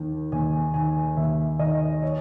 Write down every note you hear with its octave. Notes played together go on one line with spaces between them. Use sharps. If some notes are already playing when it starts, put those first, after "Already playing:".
Already playing: D#2 D#3
D#2 G#5
D#3 G#5
D#2 E5
D#3 D#5
C#5